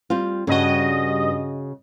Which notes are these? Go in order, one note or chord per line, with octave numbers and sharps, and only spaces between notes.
G3 C4 F4
G2 C#3 F#4 D#5